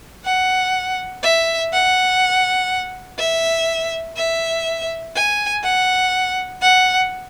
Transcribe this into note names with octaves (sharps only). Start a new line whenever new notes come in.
F#5
E5
F#5
E5
E5
G#5
F#5
F#5